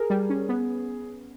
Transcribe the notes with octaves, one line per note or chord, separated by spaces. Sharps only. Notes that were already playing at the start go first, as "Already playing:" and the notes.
Already playing: G#4 A#4
G3
C#4
B3